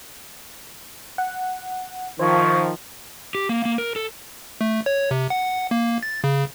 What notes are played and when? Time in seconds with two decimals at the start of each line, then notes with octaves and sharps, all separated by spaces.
1.18 F#5
2.19 D#3 F3 C5 E5 C#6 G#6
3.35 G4
3.49 A#3
3.65 A#3
3.78 A#4
3.96 A4
4.61 A3
4.86 C#5
5.11 C3
5.30 F#5
5.71 A#3
6.03 A6
6.24 C#3